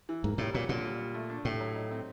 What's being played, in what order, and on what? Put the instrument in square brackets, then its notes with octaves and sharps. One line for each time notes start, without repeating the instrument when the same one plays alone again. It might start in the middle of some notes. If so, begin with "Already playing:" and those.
[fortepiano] E3
[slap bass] G#2 [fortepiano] A#3
[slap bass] A2 [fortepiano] G3
[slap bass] A#2 [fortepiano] F#3
[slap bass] A#2 [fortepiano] D3
[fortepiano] G3
G3
A3
D4
[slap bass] A2 [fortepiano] G4
[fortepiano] F#3
D#4
C4